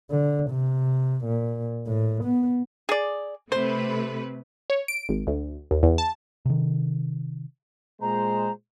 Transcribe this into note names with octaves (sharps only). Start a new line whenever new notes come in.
D3
C3
A#2
A2
B3
G#4 D5
C3 A3 B4 C5
C#5
D7
G#1
D2
D#2
E2
A5
C3 D#3
A#2 G#3 C5 A#5